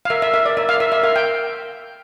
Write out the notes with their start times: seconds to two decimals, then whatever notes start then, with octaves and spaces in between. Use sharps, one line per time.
0.05 F5
0.10 A#4 E5
0.22 E5
0.34 A#4 E5
0.46 D5
0.57 A#4 E5
0.69 F5
0.80 A#4 E5
0.92 E5
1.03 A#4 F5
1.16 G5